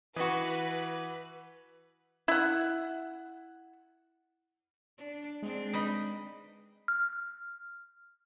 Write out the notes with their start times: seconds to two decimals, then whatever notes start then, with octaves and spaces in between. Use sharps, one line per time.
0.16 E3 F#4 B4 D#5
2.28 E4 F#5
4.98 D4
5.42 G#3 C4 D4
5.73 D#4 B4 D#5
6.88 F6